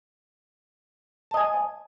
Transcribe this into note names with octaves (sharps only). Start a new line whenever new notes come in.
D#5 G#5 A5